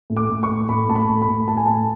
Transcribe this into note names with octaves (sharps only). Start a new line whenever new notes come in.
A2
D6
A2
C#6
A2
A2 B5
A2 A5
B5
A2
B5
A2
A2 A5
G#5
A2 A5